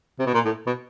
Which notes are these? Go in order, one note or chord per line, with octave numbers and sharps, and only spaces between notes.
C3
B2
A#2
A2
B2